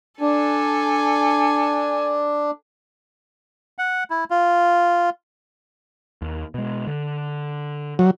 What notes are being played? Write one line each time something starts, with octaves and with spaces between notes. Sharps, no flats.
D4 A4 G#5
F#5
E4
F4
D#2
B2 G#3
D3
F#3